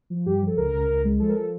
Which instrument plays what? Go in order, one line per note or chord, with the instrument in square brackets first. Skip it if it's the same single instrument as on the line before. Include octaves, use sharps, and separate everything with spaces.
[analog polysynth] F3
G2 G4
F3
A4
C#2 A#4
C#2
C#2
G#3
F3 A4
A#4
F3 A4